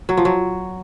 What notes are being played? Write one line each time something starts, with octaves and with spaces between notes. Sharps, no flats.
F#3
F3
F#3